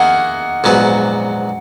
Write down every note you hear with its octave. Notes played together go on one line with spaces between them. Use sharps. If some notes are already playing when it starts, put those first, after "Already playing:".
Already playing: D#3 A#3 E4 G#4 D#5 F#5
A#1 G#2 F#3 B3